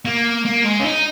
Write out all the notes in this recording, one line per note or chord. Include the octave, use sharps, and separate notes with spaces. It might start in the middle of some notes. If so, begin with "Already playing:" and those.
A#3
A#3
G#3
C#4
D#4